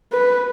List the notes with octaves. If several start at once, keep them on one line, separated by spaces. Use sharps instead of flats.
B4